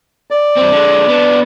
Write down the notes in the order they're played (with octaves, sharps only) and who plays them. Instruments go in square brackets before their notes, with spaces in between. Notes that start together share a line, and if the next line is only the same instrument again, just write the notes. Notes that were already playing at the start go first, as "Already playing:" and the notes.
[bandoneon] D5
[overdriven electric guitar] G2 C4
D3 G#3
B3 D4